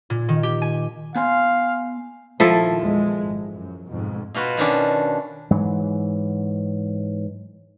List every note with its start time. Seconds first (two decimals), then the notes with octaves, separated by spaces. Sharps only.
0.10 A#2
0.29 D#3
0.43 G4
0.62 G#5
1.16 B3 F5 G#5 C6
2.40 A#1 D#3 F3 E4 A4
2.81 E2 G#3
3.21 G#1
3.53 F#2
3.86 F2 G#2 B2
4.35 B2 F4 F#4 B4
4.57 B2 D#3 C#4 D4
5.51 G#2 E3 F#3